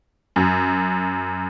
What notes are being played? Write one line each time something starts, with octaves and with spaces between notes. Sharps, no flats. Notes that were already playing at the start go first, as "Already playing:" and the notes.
F#2